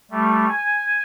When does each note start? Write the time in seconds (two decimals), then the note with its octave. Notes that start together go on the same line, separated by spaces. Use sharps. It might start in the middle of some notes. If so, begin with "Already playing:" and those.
0.11 G3 A3
0.48 G#5